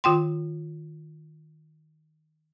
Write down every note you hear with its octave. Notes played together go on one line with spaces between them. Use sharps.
D#3 F4 G5 C6